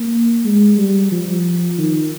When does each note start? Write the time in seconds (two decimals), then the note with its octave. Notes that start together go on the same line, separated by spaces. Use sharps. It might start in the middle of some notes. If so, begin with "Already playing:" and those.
Already playing: A#3
0.45 G#3
0.78 G3
1.12 F3
1.78 D#3